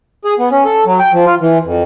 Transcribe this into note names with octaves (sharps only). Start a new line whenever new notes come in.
G#4
B3
C#4
A4
F#3
G5
F3
F4
E3
F2